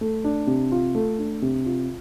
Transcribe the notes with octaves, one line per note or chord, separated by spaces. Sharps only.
A3
D4
C3
F4
A3
D4
C3
F4